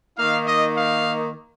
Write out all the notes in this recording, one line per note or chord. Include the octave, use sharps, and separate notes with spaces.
D#3 A#3 D#4 F5
D#5
F5